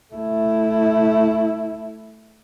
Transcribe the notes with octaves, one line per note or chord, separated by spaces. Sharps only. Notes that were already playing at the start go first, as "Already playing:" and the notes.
A3 E4